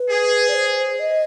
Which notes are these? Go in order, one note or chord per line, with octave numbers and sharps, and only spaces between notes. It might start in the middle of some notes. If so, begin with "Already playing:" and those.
Already playing: B4
G#4
D5
C5
D#5